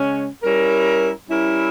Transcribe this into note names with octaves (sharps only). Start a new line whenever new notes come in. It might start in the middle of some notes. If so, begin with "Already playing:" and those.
Already playing: C#3 G#3 C#4
G3 C#4 E4 A#4
G3 C#4 E4 A#4